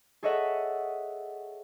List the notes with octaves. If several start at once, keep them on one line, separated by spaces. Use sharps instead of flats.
G#4 A4 C#5 D#5 E5 F#5